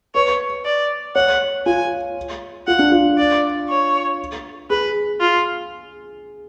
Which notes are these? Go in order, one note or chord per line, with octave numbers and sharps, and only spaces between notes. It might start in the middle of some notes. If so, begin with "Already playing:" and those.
B4 C#5
D5
C#5 F#5
F4 G#5
F4 F#5
D4
F4
D5
C#5
G#4 B4
F4